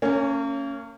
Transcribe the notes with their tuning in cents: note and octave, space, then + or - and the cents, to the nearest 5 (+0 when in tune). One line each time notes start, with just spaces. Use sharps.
A#3 -40 C#4 +0